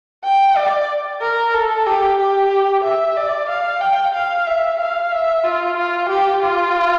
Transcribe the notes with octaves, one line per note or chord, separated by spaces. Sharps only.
G5
D5
A#4
A4
G4
G4
E5
D5
F5
G5
F5
E5
F5
E5
F4
F4
G4
F4